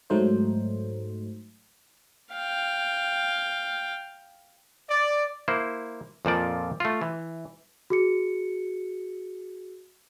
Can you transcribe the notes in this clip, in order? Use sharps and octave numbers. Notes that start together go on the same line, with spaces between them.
G#2 F#3 A3 D#4 C5
F5 G5
D5
A#3 E4 C5
F2 A#2 F3 D5
A3 F4
E3
F#4 G#4 C#7